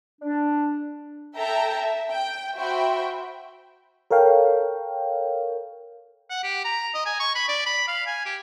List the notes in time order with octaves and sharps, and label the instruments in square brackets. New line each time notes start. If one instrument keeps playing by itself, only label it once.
[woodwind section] D4
[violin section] A4 E5 G5 A5 A#5
E5
G5
F#4 C5 E5 G5 B5
[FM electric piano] A4 A#4 C#5 F5 G5
[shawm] F#5
G4
A#5
D#5
G#5
C#6
B5
D5
B5
F5
G#5
G4